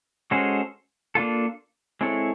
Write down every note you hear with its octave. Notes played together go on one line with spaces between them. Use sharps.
G#3 C#4 F#4 A4 C5
A#3 D4 F4 A4
G#3 C4 E4 A4 C#5